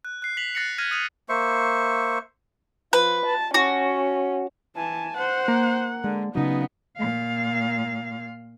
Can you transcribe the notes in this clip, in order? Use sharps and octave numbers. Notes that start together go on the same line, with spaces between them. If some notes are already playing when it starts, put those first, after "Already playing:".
F#6
F#6 C7
B6 C7 F7 F#7
F#6 A6 A#6 C7 C#7 F#7
F6 G#6 A#6 D#7
D#6 F6 B6 D#7 F7
A#3 C5 E5 C#6
F3 B4
A5
C#4 F#4
E3 G#5 A5
C5 F#5
A#3
D3 G#3
C#3 F#3 B3 D#4
A#2 F5